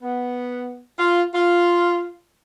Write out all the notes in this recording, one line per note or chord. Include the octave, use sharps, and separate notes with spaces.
B3
F4
F4